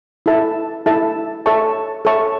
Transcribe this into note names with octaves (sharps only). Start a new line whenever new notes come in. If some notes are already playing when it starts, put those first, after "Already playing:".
E4 A4 E5 A5
E4 A4 E5 A5
A4 C#5 E5 A5 C#6
A4 C#5 E5 A5 C#6